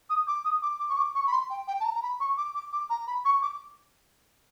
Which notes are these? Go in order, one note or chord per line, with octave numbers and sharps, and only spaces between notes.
D#6
D6
D#6
D6
D6
C#6
D6
C#6
B5
C6
G5
G5
A5
A#5
A#5
B5
C#6
D6
D6
D6
A#5
B5
C#6
D6